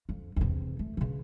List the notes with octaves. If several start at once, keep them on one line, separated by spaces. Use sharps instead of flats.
F2
E2 C3
A3
C#3 E3